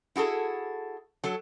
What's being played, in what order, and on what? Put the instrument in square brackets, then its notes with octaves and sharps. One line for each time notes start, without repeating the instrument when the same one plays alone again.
[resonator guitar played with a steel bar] E4 F#4 G#4 A4
F#3 A4